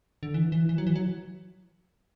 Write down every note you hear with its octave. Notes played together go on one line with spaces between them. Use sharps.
D3
E3
E3
E3
F#3
E3
F#3